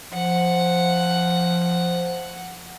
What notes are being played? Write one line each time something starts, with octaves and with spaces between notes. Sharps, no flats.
F3 F#5